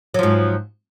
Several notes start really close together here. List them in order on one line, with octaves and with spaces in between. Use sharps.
F#3 F3 G#2